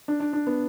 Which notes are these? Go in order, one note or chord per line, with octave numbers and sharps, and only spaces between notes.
D4
D4
D4
B3